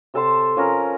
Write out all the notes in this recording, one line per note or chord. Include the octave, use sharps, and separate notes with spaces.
C3 A4 A5 C6
F3 C#4 A#4 A#5